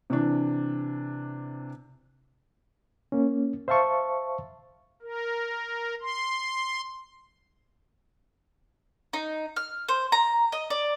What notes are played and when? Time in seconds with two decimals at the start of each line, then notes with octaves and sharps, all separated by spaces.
0.10 C3 E3 D4
3.12 A#3 C#4
3.68 C5 E5 F5 A5 C#6
5.02 A#4
6.02 C6
9.13 D#4
9.56 F6
9.88 C5
10.12 A#5
10.52 D#5
10.70 D5